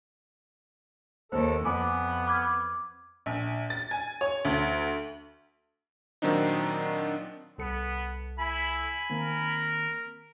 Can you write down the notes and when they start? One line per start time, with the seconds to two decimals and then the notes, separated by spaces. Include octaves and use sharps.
1.32 D#2 A4 C5
1.65 F2 B3 G#5 D6
2.28 D6 F6 G#6
3.26 A#1
3.70 A6
3.91 G#5
4.21 C#5
4.45 D2
6.22 A#2 D#3 F#3 C4 D4 D#4
7.58 C2 B3 A4 C#7
8.39 E4 G#5 B5
9.10 D#3 A#3 C4 A#4